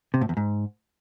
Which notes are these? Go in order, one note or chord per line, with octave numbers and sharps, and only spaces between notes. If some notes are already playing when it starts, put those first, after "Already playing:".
C3
A2
E2
G#2